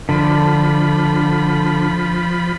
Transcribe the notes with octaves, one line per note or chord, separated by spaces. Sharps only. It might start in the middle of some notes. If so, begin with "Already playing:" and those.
D3 F3 B5